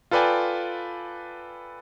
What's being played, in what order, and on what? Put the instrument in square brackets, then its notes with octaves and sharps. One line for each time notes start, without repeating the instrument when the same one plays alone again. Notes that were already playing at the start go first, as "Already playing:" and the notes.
[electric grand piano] F4 A4 B4 D5 G5 G#5